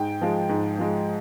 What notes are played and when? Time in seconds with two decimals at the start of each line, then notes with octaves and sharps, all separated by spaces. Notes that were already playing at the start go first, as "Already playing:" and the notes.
Already playing: G#2 G5
0.22 F3 G#3
0.49 G#2
0.79 F3 G#3